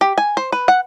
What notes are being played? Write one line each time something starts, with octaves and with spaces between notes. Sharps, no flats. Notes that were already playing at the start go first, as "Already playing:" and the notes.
G4
G#5
C5
B4
F#5